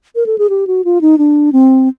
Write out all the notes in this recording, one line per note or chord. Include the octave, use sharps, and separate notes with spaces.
A#4
A4
G#4
G4
F#4
F4
D#4
D4
C4